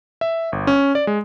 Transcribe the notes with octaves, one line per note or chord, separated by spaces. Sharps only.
E5
G1
C#4
D5
G#3